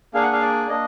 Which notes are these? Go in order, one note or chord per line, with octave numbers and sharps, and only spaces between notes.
A#3 D4 G#4 F5
F#5
F5
D5
A#3 D4 D#5